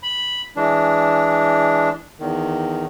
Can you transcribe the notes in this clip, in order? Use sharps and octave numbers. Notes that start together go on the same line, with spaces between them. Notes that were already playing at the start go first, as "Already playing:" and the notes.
B5
E3 G#3 D4
E2 D#3